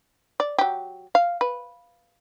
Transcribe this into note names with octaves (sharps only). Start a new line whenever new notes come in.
D5
F#3 G4
F5
B4